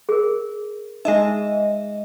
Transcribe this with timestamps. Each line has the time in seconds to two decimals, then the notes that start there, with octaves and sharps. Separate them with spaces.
0.09 G#4 A#4
1.05 G#3 D#4 D#5 E5